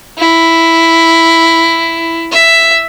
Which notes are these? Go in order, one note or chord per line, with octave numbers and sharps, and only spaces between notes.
E4
E5